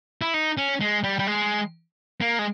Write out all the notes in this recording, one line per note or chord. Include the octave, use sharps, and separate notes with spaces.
E4
D#4
C#4
G#3
G3
G3
G#3
A#3
G#3